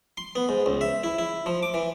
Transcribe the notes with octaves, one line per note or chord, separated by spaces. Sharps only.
C6
B3
G#2
C#2
E5
E4
E4
F3
D6
E3